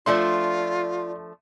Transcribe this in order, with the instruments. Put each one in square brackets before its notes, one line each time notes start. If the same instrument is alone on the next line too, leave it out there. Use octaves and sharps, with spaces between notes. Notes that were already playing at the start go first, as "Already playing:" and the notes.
[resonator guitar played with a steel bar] F3 A3 D4 [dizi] F4 [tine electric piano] D5 C6